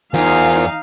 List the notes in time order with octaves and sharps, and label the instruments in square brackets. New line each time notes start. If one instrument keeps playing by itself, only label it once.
[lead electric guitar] E2 [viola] D#4 F5 [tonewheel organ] F4 A#4 C5 [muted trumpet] G#5